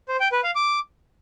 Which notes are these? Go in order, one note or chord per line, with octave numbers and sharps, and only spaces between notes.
C5
G5
B4
F5
D6